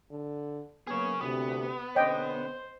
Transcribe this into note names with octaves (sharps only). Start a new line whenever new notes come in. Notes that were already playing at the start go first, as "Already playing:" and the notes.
D3
F#3 A#3 B3 G#4 C#5
D2 C3 B3
B2 D3 C#4 C5 D#5 G5